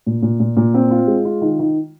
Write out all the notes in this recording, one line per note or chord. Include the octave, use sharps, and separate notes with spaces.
A#2
A#2
A#2
A#2
C4
F4
G#3
F4
D#3
D#3